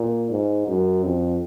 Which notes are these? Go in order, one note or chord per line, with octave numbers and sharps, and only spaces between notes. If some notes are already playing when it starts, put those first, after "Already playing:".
Already playing: A#2
G#2
F#2
F2